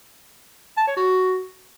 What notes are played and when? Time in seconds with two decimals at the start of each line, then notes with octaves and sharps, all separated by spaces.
0.77 A5
0.87 C#5
0.97 F#4